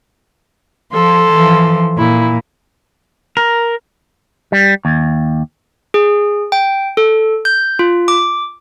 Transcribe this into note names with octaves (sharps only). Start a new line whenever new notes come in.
F3 A4 C6
E3 F3
A#2 E4
A#4
G3
D#2
G#4
G5
A4
G6
F4
D6